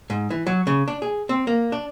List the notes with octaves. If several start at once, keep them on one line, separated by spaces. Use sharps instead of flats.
G#2
E3
F#3
C#3
D4
G#4
C4
A#3
D4